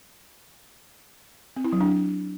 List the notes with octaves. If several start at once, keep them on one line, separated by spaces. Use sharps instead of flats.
C4
E4
F#3
D4